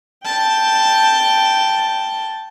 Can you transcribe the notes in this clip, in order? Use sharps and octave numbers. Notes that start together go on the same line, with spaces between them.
G5 A5